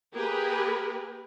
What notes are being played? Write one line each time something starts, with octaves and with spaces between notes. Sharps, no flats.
A#3 G4 G#4 A#4 B4